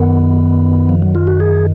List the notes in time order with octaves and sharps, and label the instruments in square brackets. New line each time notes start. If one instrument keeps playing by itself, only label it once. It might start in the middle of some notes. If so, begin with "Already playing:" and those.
Already playing: [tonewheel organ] F#2 D#3 B3
F3
F#3
F4
F#4
G#4